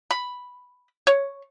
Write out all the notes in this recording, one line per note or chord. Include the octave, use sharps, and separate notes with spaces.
B5
C#5